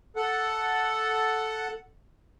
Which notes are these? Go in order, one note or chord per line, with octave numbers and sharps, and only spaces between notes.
A4 F#5